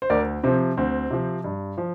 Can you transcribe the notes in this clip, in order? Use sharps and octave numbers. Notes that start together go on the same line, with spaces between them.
C5
D2 A#4 D5
C3 F3 C4
D2 C4
C3 F3
G2
F3